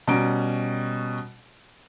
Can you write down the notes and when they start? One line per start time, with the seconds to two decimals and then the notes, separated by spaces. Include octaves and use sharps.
0.08 B2 G3 C#4 A#5 D7